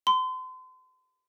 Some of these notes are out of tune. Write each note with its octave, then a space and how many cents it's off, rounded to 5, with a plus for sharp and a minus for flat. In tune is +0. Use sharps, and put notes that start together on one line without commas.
C6 -40